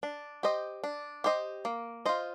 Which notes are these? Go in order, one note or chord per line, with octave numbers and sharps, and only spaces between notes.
D4
G4 C5 D#5
D4
G4 C5 D#5
A#3
F4 C5 D#5